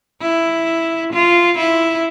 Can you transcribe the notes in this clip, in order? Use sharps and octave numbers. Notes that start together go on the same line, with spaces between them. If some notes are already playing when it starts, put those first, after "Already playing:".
E4
F4
E4